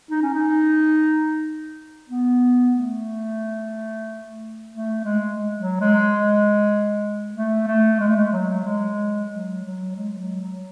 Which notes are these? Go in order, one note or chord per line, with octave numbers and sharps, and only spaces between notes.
D#4
C#4
D#4
B3
A3
A3
G#3
F#3
G#3
A3
A3
G#3
A3
G#3
F#3
G#3
F#3
F#3
G#3
F#3
F#3